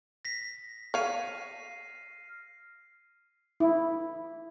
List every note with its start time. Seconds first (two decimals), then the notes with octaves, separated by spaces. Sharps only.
0.25 A#6 B6
0.94 C#5 F5 F6 C7 D#7
3.60 E4